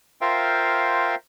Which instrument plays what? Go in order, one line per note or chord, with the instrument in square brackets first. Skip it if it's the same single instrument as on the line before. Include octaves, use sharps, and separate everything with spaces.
[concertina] F4 A#4 C5 E5 F5 G5